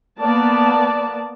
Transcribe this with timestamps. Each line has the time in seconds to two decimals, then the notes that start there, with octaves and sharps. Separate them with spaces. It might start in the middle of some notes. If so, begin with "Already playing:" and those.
0.20 A#3 B3 D5 A5